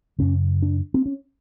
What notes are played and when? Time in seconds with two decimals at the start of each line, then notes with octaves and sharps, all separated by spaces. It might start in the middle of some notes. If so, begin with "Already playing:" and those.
0.19 F#2 C#3 C#4
0.62 D4
0.94 C4
1.06 C#4